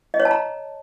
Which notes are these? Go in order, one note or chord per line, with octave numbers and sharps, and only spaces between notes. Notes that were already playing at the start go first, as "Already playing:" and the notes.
D#5
C#5
A5
A#5